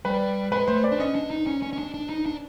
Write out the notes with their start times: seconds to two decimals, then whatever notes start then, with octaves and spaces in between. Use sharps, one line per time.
0.05 G3 B4
0.52 G#3 B4
0.68 A3 C5
0.84 D5
0.92 D4
0.99 C#4 D#5
1.15 D4
1.30 D#4
1.47 C#4
1.63 C#4
1.73 C#4
1.79 D4
1.94 D4
2.09 D#4
2.26 D4